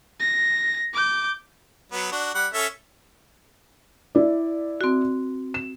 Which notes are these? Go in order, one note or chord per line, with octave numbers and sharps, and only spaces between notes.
A#6
D6 G6
F#3 B3
D4 F#4
G3 F#5
C#4 A4 E5
E4 D5
C4 F#4
E7